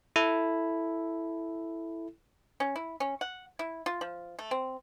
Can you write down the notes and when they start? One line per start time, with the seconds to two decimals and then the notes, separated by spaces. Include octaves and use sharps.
0.16 E4 A4
2.60 C#4
2.76 E4
3.00 C#4
3.21 F#5
3.59 E4
3.86 F4
4.01 F3
4.39 A3
4.51 C4